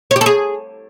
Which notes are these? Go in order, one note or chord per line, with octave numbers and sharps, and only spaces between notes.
C#5
G4
A4
G#4